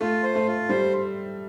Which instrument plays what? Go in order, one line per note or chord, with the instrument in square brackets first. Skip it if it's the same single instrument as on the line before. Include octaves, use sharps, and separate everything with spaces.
[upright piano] A3 [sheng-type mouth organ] F4
[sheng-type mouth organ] C5
[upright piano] A3
[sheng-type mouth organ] F4
[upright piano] G3 [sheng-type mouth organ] C5